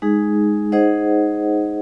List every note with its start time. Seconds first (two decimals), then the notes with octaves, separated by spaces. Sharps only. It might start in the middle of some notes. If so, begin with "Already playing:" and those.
0.02 G#3 D#4 G#4
0.72 D#4 G#4 C5 D#5 F#5